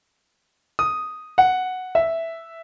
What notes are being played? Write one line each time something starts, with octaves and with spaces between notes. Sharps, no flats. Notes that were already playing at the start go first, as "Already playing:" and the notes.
D#6
F#5
E5